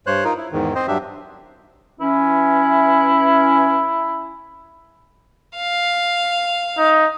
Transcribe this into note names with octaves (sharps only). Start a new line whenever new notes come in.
G2 C5 C#5 F#6
D#4 F4 A#4
E4
E2 G#2 D#3
C4 C5 D#5
G2 F#3 D4 G4 E5
E3 C#4 E4
F5
D#4